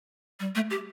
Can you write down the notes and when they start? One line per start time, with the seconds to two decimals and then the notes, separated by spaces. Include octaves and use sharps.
0.40 G3
0.55 A3
0.70 G4